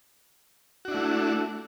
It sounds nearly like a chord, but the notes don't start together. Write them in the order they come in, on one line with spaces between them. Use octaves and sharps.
F#4 D4 E4 A3